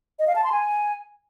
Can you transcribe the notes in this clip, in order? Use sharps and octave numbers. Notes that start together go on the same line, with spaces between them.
D#5
F5
A5
C6
G#5